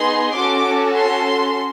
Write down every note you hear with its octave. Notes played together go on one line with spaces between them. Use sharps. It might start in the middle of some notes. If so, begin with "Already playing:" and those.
Already playing: B3 D#4 G#4 C6
C#4 F#4 A4 D6
C6